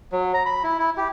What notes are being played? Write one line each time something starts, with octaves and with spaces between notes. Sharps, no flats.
F#3
A#5
B5
E4
E4
G4